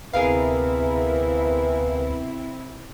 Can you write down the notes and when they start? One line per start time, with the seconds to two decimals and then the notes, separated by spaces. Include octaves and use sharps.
0.13 D2 C3 B3 C4 E4 G#4 A#4 F5